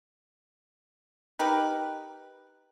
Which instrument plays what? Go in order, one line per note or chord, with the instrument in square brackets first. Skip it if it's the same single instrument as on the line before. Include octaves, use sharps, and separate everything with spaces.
[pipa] D#4 G4 A#4 B4